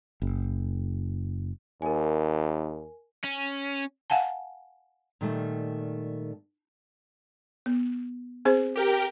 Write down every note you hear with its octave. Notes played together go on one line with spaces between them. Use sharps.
F#1
D#2 A#4 G#5
C#4
F5 F#5 G#5 A5
A#2 D#3 G3 A3
B3
C4 G#4 C5
G4 A#4 G5